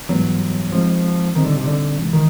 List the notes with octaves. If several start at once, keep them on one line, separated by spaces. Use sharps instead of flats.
G#2 E3 F#3 G3 B3
F3 G#3 C4 D#4
A#2 D#3 G3 C4 D#4
D3
C3
D3
E2 C3 E3 G#3
D#3